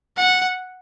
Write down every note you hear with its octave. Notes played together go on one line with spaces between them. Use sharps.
F#5